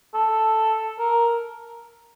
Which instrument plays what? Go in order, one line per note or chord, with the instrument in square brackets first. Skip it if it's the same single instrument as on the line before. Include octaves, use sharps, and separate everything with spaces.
[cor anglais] A4
A#4